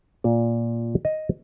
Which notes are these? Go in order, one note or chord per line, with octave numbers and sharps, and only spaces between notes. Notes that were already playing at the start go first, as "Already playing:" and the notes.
A#2
D#5